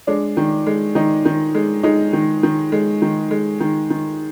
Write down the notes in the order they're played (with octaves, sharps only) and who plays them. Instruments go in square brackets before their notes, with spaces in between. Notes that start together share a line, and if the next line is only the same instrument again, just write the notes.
[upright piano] G#3 D4
D#3
G#3
D#3 D#4
D#3
G#3
G#3 D#4
D#3
D#3
G#3
D#3
G#3
D#3
D#3